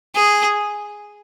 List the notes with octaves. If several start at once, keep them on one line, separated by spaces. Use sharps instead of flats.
G#4